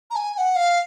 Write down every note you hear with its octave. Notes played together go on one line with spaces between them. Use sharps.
A#5
G#5
G#5
F#5
F5